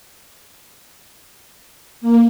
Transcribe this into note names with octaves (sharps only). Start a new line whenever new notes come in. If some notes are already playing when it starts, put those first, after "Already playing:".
A#3